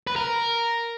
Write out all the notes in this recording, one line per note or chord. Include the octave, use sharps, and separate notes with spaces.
B4
A#4